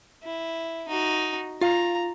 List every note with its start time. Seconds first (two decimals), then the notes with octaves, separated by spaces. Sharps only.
0.23 E4
0.88 D#4 F#4
1.61 F4 F5 A#5